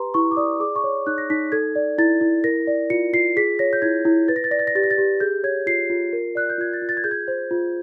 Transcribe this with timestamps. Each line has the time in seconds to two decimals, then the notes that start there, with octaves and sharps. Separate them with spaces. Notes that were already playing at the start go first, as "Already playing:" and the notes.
Already playing: G4 B4 A#5 C6
0.14 E4 C#6
0.31 D6
0.37 D5 D#6
0.60 G#4 D6
0.76 C#6
0.84 C#5
1.07 D#4 F#6
1.18 A#6
1.30 D#4 B6
1.52 A4 G#6
1.75 D5
1.98 E4 A6
2.21 E4
2.44 A#4 A#6
2.67 D5
2.90 F4 C#7
3.13 F4 C7
3.37 G#4 B6
3.59 C#5 A#6
3.73 G6
3.82 E4 G#6
4.05 E4
4.28 B4 A6
4.36 A#6
4.44 A6
4.51 D5 A#6
4.59 A6
4.67 A#6
4.75 G4 A6
4.84 A#6
4.91 A6
4.98 G4
5.20 G#4 G6
5.44 C#5 G#6
5.67 F4 C7
5.90 F4
6.13 A#4
6.35 D5 F#6
6.50 G6
6.58 F4 G#6
6.73 A6
6.82 F4
6.89 A6
6.97 G#6
7.04 G#4 G6
7.11 G#6
7.28 C5
7.51 F4